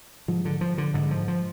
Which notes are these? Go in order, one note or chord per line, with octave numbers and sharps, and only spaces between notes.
G#2 F3
D3
F3
D3
G#2 D3
F3
F3